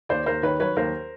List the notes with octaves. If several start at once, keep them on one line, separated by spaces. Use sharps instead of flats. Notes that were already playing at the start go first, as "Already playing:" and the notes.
D#2 C5 D5
D#2 A#4 C5
D#3 B4 C#5
F#3 B4 C#5
D#2 A#4 C5